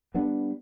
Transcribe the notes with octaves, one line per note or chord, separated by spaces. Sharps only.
G3 B3 D4